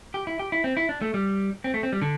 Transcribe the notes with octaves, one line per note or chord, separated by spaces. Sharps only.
G4
E4
G4
E4
C4
E4
D4
A3
G3
C4
A3
C4
G3
D3